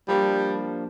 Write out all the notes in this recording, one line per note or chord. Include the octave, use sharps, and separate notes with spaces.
F3 G3 A#3 D4